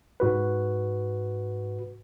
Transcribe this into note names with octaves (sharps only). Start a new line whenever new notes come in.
G#2 F#4 B4